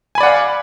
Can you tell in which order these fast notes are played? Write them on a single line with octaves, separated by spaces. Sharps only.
G#5 B5 D5 F#5 F5